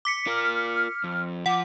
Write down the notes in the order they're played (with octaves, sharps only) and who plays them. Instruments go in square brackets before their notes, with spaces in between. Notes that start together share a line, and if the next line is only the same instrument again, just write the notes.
[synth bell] D6 B6 C#7
[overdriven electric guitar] F4 A#4 [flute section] F6
[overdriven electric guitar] F2
[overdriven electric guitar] F3 [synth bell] F#5 [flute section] D6